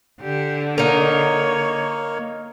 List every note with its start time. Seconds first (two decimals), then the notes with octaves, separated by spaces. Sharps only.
0.21 D3 G4
0.78 A#3 D#4 A#4 C#5